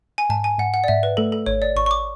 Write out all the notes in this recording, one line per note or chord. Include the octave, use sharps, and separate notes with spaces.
G#5
G#2 A5
G#5
G#2 F#5
F#5
D5
G#2 E5
B4
A3 A4
A4
G#1 C#5
D5
G#1 C#6
C#6
D6